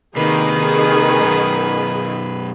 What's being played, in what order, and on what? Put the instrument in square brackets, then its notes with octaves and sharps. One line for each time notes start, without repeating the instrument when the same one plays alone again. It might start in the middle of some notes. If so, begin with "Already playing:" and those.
[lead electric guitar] C3 A#3 [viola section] D#3 G#4 [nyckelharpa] B4
[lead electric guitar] F#2 B2